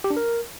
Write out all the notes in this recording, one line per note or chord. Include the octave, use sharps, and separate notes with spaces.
G4
D4
A#4